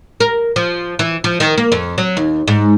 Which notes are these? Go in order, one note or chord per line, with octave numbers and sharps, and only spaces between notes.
A#4
F3
E3
F3
D#3
A#3
F2
F#3
D#2
G#2